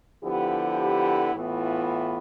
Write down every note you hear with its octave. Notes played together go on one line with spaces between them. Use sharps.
D3 F3 B3 E4 G4
A2 E3 B3 F4